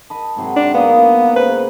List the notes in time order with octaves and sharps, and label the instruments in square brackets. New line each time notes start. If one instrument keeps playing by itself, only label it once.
[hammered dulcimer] D#5 B5 [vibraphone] A5
[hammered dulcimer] G#2 C3 F#3
[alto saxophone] D4
[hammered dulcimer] A#3 A#4 D#5 [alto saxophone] B3 [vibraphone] F5
[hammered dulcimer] C#3 [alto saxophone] B4 [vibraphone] C5